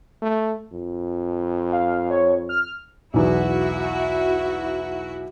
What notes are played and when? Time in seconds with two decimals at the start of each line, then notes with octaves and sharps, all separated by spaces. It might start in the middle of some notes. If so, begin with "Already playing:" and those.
0.22 A3
0.73 F2
1.72 F5
2.11 C#5
2.49 F6
3.14 B1 E2 E4 F#4